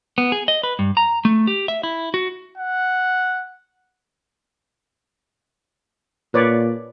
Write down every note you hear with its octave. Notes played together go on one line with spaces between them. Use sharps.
B3
G#4
D#5
B4
G2
A#5
A3
G4
E5
E4
F#4
F#5
A#2 B4 C#5 D5